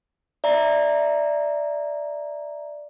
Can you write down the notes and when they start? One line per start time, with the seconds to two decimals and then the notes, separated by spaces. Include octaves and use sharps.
0.44 D5 E5 A#5